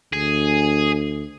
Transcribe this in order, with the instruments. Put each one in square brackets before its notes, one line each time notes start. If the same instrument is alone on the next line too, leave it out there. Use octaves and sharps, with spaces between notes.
[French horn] D2 [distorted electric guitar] G#4